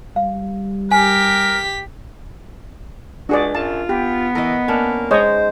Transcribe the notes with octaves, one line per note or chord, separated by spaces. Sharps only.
G3 F5
G4 A#4 G#5 B6
C#2 D4 F#4 G#4 D5
F#2 F4 A5
B3 G4
E3 A#4 D#5
A#3 C#4 D4
G#3 D#4 C5 C#5 D#5